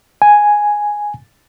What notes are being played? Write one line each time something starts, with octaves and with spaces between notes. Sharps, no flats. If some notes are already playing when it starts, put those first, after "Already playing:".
G#5